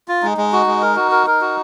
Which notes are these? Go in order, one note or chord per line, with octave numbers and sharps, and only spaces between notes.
F4
G#3 D#4
G#3
F#4
G#3
A#4
F#4
A#4
A#4
F#4